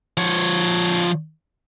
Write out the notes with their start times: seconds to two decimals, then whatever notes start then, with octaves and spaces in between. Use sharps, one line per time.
0.17 F3 C#5